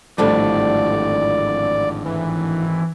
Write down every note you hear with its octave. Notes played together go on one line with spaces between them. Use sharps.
G#1 F2 A2 D3 G3 D5
E3